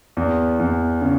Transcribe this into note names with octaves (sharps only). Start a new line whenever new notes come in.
E2
E2
C#3